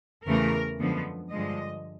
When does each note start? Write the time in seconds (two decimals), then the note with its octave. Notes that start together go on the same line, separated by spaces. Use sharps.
0.25 E2 C#3 E3 A3 A#4
0.79 F#2 D3 F3 G#3 B3
1.32 G2 D3 F3 G#3 D#5